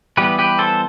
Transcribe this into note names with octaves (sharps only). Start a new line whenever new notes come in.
E3 G3 B3 G4 B4
G4 B4
A4 C5